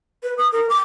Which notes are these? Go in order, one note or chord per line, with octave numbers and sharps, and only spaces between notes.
B4
D#6
A#4
D6